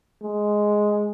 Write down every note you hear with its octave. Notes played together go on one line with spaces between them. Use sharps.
G#3